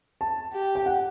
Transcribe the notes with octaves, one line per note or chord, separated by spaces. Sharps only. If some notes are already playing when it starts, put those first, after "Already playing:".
A5
G4
G5
F#5